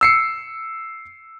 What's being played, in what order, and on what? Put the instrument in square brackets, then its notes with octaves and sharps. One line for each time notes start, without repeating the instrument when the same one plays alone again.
[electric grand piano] E6 C7 C#7